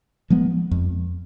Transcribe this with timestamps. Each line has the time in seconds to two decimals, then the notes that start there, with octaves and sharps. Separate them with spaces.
0.30 F3 G#3 B3
0.71 F2